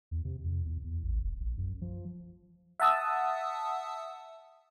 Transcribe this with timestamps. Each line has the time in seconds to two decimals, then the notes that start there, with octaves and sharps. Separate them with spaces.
0.11 E2
0.25 C3
0.44 F2
0.65 E2
0.84 E2
1.03 A1
1.22 E1
1.40 A#1
1.58 F#2
1.81 F3
2.80 E5 F#5 A5 D#6 E6